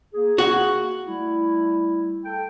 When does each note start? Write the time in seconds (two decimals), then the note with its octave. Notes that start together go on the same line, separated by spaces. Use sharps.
0.14 A#3 G#4
0.38 F#4
1.06 G3 A3 E4
2.25 A4 G5